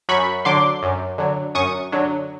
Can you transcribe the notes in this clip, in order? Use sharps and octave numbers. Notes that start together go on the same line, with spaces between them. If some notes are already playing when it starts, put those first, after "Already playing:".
F#2 B5 C#6
D3 F#3 C6 D6
F#2
D3 F#3
F#2 C#6 D#6
D3 F#3